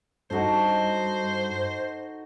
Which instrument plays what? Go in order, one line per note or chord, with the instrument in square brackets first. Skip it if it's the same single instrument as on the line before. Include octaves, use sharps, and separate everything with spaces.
[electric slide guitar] G2 [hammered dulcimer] D#4 F#4 A4 [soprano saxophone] C5